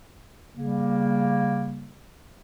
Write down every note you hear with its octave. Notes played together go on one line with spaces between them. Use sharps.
C#3 G3 A#3